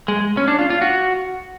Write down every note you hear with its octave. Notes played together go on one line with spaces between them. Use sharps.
G#3
C#4
D4
F4
F4
F#4